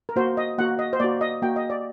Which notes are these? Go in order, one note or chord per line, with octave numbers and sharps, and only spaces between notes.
A#4
A#3 F#4 C5
D#5
A#3 F#4 F#5
D#5
C5
A#3 F#4 D5
D#5
A#3 F#4 G5
D#5
D5